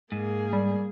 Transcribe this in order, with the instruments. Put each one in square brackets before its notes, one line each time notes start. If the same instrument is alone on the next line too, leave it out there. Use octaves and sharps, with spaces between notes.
[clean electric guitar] G#2 [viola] A#3 G#4
[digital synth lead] G3